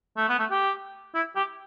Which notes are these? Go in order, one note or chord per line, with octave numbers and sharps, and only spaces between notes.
A3
B3
A3
G4
E4
G4